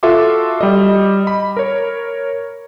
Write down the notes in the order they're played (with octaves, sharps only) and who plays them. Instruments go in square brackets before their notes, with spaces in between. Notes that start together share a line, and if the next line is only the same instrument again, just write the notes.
[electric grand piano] F4 F#4 A4 E5 C6 D6
G3 D#5
B5
A#4 C#5